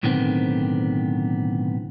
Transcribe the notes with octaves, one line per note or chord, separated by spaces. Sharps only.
B1 A2 D3 D#3 B3 C4